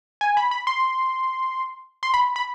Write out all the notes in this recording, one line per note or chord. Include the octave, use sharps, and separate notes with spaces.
G#5
B5
B5
C6
C6
B5
B5